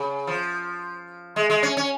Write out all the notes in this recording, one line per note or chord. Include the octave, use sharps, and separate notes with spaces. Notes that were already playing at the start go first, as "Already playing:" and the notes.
Already playing: C#3
F3
G#3
G#3
C#4
C#4